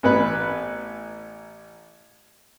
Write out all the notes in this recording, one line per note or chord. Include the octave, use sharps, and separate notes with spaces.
A1 B3 B4